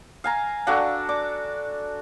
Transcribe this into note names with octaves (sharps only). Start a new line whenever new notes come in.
F5 G#5 A#5
D4 F#4 A4 D5 F5
D5 D6